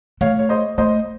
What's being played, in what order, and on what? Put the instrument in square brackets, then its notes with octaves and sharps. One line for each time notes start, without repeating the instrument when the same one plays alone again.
[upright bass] A3 [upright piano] C#5 F5
[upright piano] C#5
C5 D#5
[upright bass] A3 [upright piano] C5 D#5